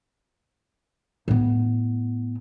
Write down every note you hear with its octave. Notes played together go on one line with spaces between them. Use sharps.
A2 B3